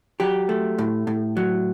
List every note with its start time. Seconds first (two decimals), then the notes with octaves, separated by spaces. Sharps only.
0.20 F#3 G4
0.49 A3
0.78 A2
1.07 A2
1.37 F#3